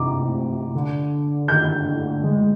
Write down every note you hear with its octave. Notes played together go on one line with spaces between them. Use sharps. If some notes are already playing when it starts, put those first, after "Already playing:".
Already playing: C3 A#5 D6
D3
D#3 G6
D3
D3
G#3